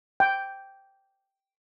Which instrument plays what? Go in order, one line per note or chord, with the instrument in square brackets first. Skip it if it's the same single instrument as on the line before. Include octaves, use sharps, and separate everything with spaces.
[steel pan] G5